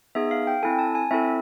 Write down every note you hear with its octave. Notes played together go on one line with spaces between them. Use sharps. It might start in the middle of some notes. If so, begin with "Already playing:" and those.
B3 D#4 G#4 E5
F5
G5
C4 E4 A4 G#5
A5
G#5
C4 E4 A4 E5